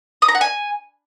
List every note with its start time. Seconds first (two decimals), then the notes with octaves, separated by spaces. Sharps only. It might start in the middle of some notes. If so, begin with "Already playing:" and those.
0.22 D#6
0.28 A#5
0.35 F#5
0.41 G#5